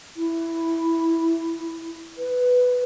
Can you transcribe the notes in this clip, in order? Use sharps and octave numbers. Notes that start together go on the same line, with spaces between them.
E4
B4